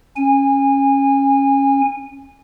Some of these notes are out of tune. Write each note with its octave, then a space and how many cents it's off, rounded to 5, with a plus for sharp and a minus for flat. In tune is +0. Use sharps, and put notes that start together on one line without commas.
C#4 -15 G#5 -25